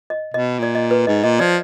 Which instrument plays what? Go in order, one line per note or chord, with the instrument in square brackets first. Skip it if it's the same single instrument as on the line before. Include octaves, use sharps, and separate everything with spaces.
[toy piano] D#5
[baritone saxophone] B2 [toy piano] D#5
[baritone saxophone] A#2 [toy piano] D5
[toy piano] D#5
B4
[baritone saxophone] G#2 [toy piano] D#5
[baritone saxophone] A#2 [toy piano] D#5
[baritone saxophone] F3 [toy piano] D5